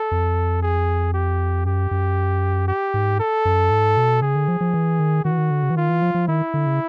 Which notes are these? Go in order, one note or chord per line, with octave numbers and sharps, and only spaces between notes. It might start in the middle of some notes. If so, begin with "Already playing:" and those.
Already playing: A4
F2
G#4
G4
F#2 G4
F#2
G4
G#2
A4
F#2
G#2
B2
C#3 G#4
D3
F3
F3
E3
D#3
D#3 F#4
E3
D#3
D3
C#3
E3
D#3 F4
E3
F3
F3
D#3 E4
D3
C#3